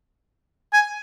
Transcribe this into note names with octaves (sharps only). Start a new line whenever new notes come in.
G#5